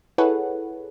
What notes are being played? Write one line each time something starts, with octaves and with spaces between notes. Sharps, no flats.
E4 G#4 A4 B4 C#5 F#5